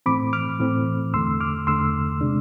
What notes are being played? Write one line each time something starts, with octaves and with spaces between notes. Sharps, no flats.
A2 E3 A3 C4 B5 D6
D6 F6
A2 E3 A3 C4
E2 D3 A3 C6 E6
D6 F6
E2 D3 A3 C6 E6
C3 G#3 D4